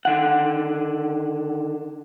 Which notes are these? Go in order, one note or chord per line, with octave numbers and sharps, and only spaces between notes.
D3 D#3 F#5